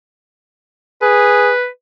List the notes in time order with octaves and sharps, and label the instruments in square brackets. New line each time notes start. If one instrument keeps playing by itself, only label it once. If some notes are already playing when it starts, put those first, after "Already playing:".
[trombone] G#4 [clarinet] B4